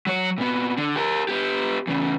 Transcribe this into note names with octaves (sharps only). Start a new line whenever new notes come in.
F#3 C#5
A#2 B3
D3
G4 A#4
B3 G4
E2 C#3